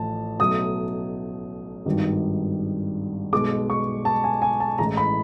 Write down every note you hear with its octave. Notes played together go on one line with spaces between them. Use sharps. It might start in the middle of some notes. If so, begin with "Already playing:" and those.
Already playing: A1 A2 F3 A5
B1 B2 F#3 A3 D#6
G#1 G2 D#3 G3
B1 B2 G#3 D6
C#6
A5
G#5
G#5
A5
A1 A2 E3 G#3 A#5
B5